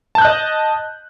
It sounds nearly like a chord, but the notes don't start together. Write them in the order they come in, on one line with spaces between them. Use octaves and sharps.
A5 G6 F#6 D#5